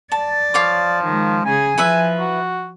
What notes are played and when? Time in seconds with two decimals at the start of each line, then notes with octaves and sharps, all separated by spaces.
0.12 D5 A5
0.54 F3 C#5 F5 D6
1.04 D#3 G#3
1.45 C#3 G#4 G#5
1.78 F3 E4 B4 E5
2.19 F#4